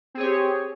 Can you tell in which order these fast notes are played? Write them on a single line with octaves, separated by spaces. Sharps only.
C4 G#4 C#5 G4